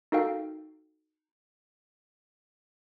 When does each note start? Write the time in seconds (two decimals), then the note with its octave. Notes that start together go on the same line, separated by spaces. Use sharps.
0.12 D#4 F#4 A4 A#4 F5 G5